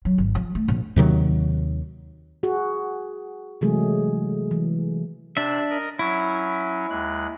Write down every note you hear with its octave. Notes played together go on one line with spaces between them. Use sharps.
F#3
G#1
F3
A3
A#1
D#2 C3 D#3 F#3
F#4 G#4
C3 E3 F#3 G#3 A3 G#4
E3
C3 D4 E5
A#4 D#5
F#3 C#4 E4
D#2 G#3 F#6